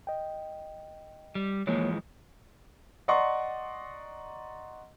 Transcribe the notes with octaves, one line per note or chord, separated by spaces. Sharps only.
D#5 G5
G3
E3 F3 G#3 A#3 E4 C#5
D5 D#5 F#5 A#5 C6 C#6